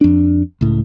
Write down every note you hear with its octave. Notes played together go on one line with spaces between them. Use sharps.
F2 D4
C#2 A2